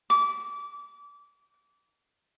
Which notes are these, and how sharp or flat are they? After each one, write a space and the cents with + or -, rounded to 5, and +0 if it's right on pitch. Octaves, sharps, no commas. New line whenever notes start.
D6 -25